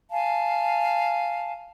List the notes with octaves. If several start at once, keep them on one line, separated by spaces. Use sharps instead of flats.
F5 G#5 A5